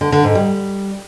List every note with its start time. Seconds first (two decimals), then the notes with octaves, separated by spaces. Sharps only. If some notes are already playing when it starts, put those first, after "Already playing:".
0.01 D3
0.12 D3
0.24 G#2
0.35 G3